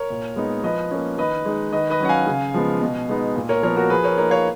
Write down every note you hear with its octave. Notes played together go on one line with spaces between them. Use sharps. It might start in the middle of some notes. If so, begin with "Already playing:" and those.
Already playing: A#4 C#5
A#2
G#3 B3 D#4
F3 B4 D#5
A#3 C#4
D#3 B4 D#5
G#3 D#4
D#3 B4 D#5
B4 D#5
F#3 C#4 F#5
F5 G#5
C#3
F3 G#3 B3
B2
G#3 B3 D#4
A#2
A#4 C#5
F3 B3 A#4 C#5
F#4 A#4
F3 G#4 B4
A#4 C#5
A#3 D#4 A#4 C#5
C#5 F5